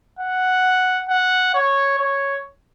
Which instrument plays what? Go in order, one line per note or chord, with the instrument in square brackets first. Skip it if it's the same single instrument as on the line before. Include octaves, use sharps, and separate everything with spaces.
[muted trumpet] F#5
F#5
C#5
C#5